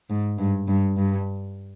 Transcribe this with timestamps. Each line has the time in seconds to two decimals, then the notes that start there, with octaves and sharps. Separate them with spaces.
0.10 G#2
0.38 G2
0.68 G2
0.97 G2